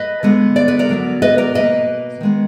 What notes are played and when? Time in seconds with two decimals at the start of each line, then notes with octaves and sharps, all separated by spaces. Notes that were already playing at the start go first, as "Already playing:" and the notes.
Already playing: B4 D#5
0.23 D3 G#3 B3
0.56 D5
0.68 B4
0.79 A#4 D5
0.89 D3 F#3 B3
1.22 B4 D#5
1.38 A#4 D5
1.54 B2 A#3 B4 D#5
2.21 D#3 G#3 B3